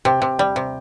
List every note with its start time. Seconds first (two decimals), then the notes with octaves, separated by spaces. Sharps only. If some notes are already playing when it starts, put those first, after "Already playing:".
0.05 C3 G5
0.22 C3
0.39 G3 G5
0.56 C3